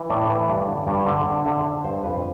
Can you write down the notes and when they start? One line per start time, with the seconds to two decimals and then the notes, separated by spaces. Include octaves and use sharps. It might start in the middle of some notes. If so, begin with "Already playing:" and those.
Already playing: E3
0.10 A2 D5
0.30 E3
0.48 G2 D5
0.67 D3
0.87 G2 D5
1.06 D3
1.25 D3
1.45 D3 E5
1.64 D3
1.84 G2 C5
2.04 F2 B4